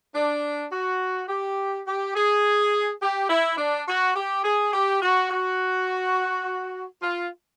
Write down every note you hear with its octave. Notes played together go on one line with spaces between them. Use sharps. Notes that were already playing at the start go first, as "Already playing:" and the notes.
D4
F#4
G4
G4
G#4
G4
E4
D4
F#4
G4
G#4
G4
F#4
F#4
F4